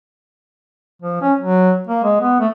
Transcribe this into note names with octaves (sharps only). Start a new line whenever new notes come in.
F3
C#4
F#3
A#3
G#3
B3
A3